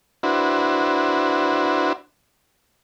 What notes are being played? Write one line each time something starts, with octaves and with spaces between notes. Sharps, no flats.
D4 E4 F#4 B4 C5